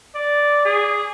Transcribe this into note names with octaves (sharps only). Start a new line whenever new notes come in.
D5
G#4